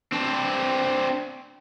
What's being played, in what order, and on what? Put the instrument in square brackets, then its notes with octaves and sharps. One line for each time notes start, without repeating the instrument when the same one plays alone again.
[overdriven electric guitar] C4 D4